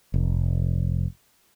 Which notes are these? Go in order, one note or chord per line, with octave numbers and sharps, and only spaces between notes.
F1